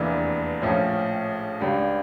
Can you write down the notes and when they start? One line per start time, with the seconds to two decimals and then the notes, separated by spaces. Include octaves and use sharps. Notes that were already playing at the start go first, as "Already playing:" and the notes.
Already playing: F1 E2 E3 A#3 D4
0.62 A#1 A2 F3 C#4
1.60 C#2 C#3 G3 D4